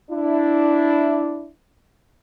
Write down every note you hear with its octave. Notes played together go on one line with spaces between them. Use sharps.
D4 E4